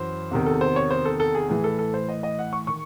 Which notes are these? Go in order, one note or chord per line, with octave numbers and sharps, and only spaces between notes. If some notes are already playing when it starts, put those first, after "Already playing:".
Already playing: F#2 E3 C5
E2 C3 D#3
A4
C5
C#5
C5
A4
A4
G#4
A2 E3 G#4
A4
A4
C5
D#5
D#5
F#5
C#6
D#3 C#6